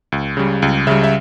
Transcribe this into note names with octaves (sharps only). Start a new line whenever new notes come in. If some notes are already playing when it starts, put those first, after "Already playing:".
C#2
C#3 G3
C#2
C#3 G3 E5
E5